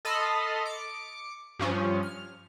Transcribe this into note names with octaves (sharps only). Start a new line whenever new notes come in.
A4 D#5 A5 B5 C6 F6
D6 C#7
G2 F3 C#4
F6